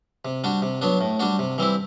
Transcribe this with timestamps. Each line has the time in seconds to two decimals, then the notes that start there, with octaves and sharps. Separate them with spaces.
0.25 C3
0.44 G3 D4 F#4
0.62 C3
0.82 F#3 B3 D4
1.01 A2
1.19 G3 D4 F#4
1.39 C3
1.58 E3 G3 C4 E4